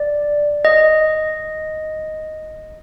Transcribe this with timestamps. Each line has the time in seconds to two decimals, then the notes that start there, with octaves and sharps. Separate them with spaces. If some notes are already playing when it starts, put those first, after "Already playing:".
Already playing: D5
0.65 D#5